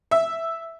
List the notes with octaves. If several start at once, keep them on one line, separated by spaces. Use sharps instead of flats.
E5